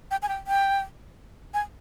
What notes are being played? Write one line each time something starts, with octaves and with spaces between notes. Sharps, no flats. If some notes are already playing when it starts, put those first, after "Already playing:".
G5
G#5
G5
G5
G#5